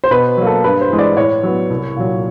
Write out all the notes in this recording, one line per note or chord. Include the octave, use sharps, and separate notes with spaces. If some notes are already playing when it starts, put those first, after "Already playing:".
C5
B2 B4
F#3 A#3
A4
G2 B4
C5
E3 G#3
D5
A2 C#5
F#3 B3
C2
A#2 F#3